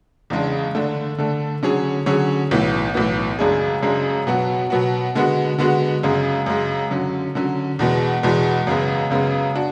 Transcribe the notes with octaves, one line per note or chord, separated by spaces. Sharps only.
E2 C#3 G#3 D4
D3 A3 D4
D3 A3 D4
D3 F#3 C#4 G#4 C#5
D3 F#3 C#4 G#4 C#5
B1 A2 E3 B3
B1 A2 E3 B3
F#2 C#3 G#3 D4 G#4
F#2 C#3 G#3 D4 G#4
B2 F#3 B3 F#4
B2 F#3 B3 F#4
D3 G#3 B3 F#4
D3 G#3 B3 F#4
F#2 C#3 G#3
F#2 C#3 G#3
D3 F#3 C#4
D3 F#3 C#4
E2 B2 G#3 B3
E2 B2 G#3 B3
F#2 C#3 G#3 B3
F#2 C#3 G#3 B3
D4 F#4